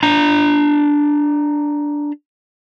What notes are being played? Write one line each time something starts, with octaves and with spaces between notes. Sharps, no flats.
D4 A#5